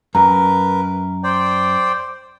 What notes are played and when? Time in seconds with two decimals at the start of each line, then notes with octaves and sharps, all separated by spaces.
0.15 F#2 A#4 B4 A#5
1.24 C5 D5 G5